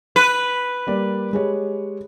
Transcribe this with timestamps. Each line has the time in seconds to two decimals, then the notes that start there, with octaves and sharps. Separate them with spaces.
0.16 B4
0.87 G3 A#3 D5
1.33 G#3 G4 C#5